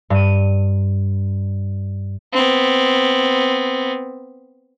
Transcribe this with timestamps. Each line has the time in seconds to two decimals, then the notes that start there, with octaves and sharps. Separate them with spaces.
0.10 G2 D#7
2.33 B3 C4